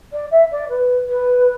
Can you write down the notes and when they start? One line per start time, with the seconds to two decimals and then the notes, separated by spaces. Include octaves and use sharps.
0.12 D5
0.31 E5
0.51 D5
0.69 B4
1.08 B4